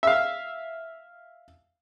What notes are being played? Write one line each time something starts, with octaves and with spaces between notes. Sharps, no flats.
E5 F5